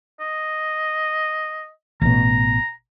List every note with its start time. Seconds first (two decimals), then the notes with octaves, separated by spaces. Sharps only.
0.20 D#5
2.01 A1 B2 A#5